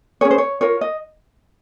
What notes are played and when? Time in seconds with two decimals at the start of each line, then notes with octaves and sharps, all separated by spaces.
0.21 C#4 G#4 C#5
0.31 C5
0.38 C#5
0.61 F4 A#4 C#5
0.81 D#5